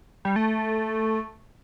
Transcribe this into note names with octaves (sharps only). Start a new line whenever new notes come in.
G3
A3